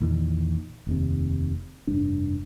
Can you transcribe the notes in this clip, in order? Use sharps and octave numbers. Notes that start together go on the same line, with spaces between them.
A#1 E2 A#2 D#3
F1 D#2 C3
F1 G2 D4